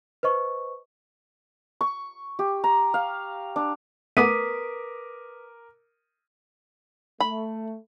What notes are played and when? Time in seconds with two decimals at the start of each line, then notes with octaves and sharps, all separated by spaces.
0.23 B4 C5 D#5 C#6
1.81 C#6
2.39 G4
2.64 A#5
2.94 F5
3.56 D4
4.17 A3 B3 A#4 B4 D6 D#6 B6 D#7
7.20 A3 B5